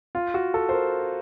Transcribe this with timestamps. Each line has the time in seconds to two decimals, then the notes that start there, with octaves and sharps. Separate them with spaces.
0.15 F4
0.34 F#4
0.54 A4
0.69 C5
0.73 A#4